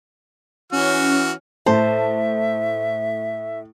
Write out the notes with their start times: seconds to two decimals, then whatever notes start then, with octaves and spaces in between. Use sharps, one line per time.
0.72 E3 C#4 F#4 F6
1.66 A2 C5 E5 A5